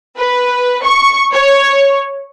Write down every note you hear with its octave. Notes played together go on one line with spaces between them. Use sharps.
B4
C#6
C#5